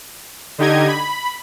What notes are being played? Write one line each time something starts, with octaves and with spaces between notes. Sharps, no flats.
D3 D#4 G4 D#5 G#6
B5